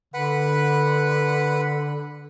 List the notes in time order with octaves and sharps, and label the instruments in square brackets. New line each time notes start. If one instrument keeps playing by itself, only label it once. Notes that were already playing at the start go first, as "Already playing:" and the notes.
[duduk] D3 [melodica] B4 F#5 B5